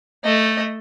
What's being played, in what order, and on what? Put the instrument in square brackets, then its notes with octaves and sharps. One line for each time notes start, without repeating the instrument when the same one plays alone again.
[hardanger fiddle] A3 D#5